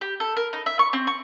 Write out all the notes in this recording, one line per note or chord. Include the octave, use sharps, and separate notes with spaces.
G4
A4
A#4
D#4
E5
C#6
C4
C#6